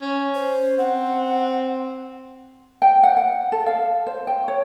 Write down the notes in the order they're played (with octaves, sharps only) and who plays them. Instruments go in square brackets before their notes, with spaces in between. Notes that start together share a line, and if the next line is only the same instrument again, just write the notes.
[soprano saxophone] C#4
[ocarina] C5
[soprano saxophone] C4 [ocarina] F#5
[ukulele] G5
F#5
F#5
A4
F5
C5
G5
C#5